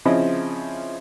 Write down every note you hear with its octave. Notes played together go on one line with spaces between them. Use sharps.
C#3 F3 C4 C#4 E4 D#5